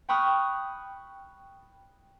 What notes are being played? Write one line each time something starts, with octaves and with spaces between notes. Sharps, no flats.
G5 B5 C#6 D#6 F6 F#6